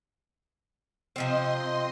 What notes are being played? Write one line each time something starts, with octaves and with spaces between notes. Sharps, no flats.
C3 F3 C4 D#5 C6